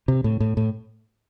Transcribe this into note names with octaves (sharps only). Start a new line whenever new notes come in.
C3
A2
A2
A2